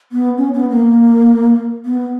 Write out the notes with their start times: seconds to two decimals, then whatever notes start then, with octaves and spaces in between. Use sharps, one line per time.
0.12 B3
0.37 C#4
0.54 B3
0.70 A#3
1.85 B3